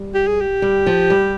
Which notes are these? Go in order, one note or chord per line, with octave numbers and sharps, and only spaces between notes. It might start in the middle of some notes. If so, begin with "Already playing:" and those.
Already playing: G3
G4
G#4
G4
G3
F3
G3